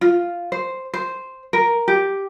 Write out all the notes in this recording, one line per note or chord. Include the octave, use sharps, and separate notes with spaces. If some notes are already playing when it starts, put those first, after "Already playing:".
F4
C5
C5
A#4
G4